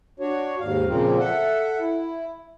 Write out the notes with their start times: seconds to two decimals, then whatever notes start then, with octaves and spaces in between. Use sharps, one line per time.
0.20 D4 F#4 C#5
0.60 D#2 G#2 F5
0.87 A#2 C#3 F3 A#3 C4
1.18 A4 E5 F#5
1.79 E4